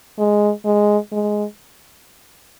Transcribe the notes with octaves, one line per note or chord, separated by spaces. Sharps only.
G#3
G#3
G#3